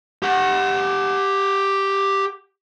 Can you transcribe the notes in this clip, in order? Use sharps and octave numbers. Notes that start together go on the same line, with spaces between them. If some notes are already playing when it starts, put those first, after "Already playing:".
G4 F#5